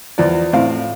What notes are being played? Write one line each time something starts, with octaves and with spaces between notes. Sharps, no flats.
E2 F3 D5
A2 C4 F5